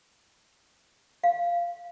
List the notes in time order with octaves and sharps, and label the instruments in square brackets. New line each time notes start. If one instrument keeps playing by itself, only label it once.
[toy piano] F5